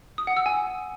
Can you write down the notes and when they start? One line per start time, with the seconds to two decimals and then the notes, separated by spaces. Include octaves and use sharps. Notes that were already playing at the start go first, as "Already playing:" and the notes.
0.18 D#6
0.27 F#5
0.37 E6
0.46 G#5